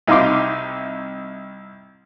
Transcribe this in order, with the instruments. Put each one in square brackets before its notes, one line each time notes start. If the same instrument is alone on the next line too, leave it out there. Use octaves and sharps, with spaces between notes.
[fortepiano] C2 D#4 E4 F5 C6 D6